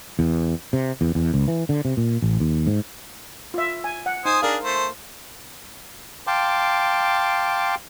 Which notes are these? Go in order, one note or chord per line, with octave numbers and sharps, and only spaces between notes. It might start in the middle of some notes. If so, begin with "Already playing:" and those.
E2
C3
E2
E2
C#2
E3
D3
C3
A#2
A1
D#2
G#2
F4 E5
G#5
F#5
D#4 C5 G#5 D#6
D4 G#4 A#4 F5
A3 C5
F5 G5 A5 C6 D6